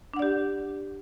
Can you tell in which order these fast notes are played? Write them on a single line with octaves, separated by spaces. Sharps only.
D4 F#5 D5 G4